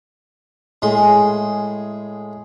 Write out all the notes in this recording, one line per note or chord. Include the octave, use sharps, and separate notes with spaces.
A2 G#3 G#4 C6